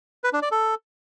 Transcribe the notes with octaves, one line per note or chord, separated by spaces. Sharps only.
B4
D4
D5
A4